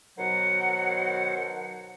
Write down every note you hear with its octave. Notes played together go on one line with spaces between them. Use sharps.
B2 D#3 F#3 C5 F#5